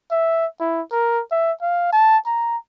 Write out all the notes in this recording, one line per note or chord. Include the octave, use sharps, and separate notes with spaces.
E5
E4
A#4
E5
F5
A5
A#5